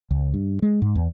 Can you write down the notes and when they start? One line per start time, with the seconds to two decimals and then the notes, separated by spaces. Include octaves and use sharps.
0.11 C#2
0.34 G2
0.62 G#3
0.82 G#2
0.95 E2